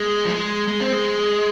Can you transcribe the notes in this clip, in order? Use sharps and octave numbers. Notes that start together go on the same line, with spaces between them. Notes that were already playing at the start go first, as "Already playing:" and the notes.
Already playing: G#3
F3
G#3
G#3
C4
G#3